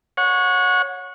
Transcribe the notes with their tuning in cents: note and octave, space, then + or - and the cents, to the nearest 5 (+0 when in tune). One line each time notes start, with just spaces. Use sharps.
C#5 +0 F#5 -25